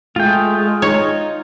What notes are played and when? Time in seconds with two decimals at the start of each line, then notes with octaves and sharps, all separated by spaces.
0.16 G#3 A3 F4 G5
0.82 D#4 C#5